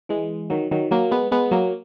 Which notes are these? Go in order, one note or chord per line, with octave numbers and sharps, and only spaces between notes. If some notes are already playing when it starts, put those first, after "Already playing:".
E3 G#3
D#3 F#3
D#3 F#3
F#3 A#3
G#3 B3
G#3 B3
F#3 A#3